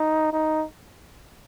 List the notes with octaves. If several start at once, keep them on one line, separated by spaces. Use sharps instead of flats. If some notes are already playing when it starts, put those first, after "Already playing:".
Already playing: D#4
D#4